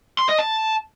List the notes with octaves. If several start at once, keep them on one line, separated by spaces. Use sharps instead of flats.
C6
D#5
A5